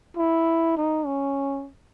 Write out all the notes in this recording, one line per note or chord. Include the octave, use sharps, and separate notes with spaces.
E4
D#4
C#4